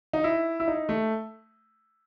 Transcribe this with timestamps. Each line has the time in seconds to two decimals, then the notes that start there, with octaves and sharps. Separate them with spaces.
0.13 D#4
0.24 E4
0.60 E4
0.68 D#4
0.89 A3